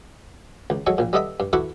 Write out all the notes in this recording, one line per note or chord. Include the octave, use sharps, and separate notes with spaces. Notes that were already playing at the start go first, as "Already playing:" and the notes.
C#2
F#3 G#3 A4 C#6
A#1 A#2
G3 B3 A4 D#5 E5 B5
G2
E4 F#4 A4 B4 C#6 D6